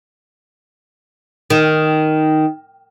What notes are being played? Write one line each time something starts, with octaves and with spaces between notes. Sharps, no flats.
D#3